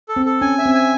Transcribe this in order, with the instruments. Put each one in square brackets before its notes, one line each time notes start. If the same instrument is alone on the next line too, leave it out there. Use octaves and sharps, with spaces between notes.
[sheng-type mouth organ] A4
[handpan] C4
[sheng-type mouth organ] A4
[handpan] C#4 [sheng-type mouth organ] G#5
[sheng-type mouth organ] E5
[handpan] C4
[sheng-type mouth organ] G#5